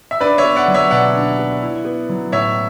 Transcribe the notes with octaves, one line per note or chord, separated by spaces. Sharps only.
E5
D4 B4 D5
C#5 E5
B3
D5 F#5
F#3
C#5 E5
B2 D5 F#5
D4
B3
E4
B3
F#3
A2 C#5 E5